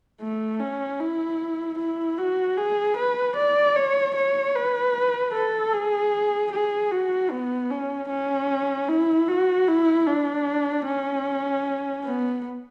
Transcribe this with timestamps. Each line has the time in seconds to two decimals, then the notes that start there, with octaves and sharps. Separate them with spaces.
0.21 A3
0.60 C#4
1.00 E4
1.78 E4
2.18 F#4
2.57 G#4
2.97 B4
3.36 D5
3.75 C#5
4.15 C#5
4.55 B4
5.33 A4
5.73 G#4
6.52 G#4
6.92 F#4
7.31 B3
7.71 C#4
8.09 C#4
8.88 E4
9.28 F#4
9.68 E4
10.07 D4
10.86 C#4
12.04 B3